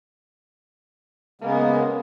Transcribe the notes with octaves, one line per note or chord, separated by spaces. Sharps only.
C#3 G#3 A#3 B3 A#4